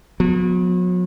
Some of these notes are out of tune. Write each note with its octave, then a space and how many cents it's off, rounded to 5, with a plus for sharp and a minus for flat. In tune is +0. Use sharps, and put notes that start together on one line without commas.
F#3 -40 B3 +0